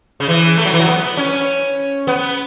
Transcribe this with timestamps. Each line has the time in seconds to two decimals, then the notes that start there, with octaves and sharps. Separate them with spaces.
0.20 C#3
0.28 E3
0.57 A3
0.65 F#3
0.73 E3
0.79 F#3
0.87 B3
1.17 C#4
2.07 B3